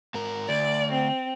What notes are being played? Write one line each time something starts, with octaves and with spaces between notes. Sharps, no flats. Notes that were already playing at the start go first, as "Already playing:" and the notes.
G#2 A#4
D2 D5
C4